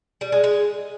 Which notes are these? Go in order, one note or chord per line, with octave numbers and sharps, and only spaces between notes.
G3
G#3
G#3